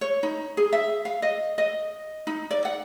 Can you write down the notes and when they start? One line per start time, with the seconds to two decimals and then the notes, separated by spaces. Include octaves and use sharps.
0.01 C#5
0.23 D#4
0.57 G#4
0.73 E5
1.05 F5
1.22 D#5
1.58 D#5
2.27 D#4
2.51 D5
2.65 F#5